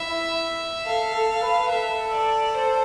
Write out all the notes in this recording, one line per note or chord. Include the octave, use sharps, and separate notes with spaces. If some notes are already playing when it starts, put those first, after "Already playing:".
Already playing: E4 E5
A4 F5
A4
B4
A4 E5
D5
C5